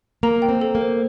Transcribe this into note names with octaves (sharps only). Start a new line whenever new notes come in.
A#3 A#5
G5
C4
A4
A#3
C5